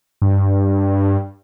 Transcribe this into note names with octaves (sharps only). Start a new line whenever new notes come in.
G2